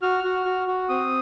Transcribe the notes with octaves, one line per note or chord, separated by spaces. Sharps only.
F#4 F6
F#4
F#4
F#4
C4 D#6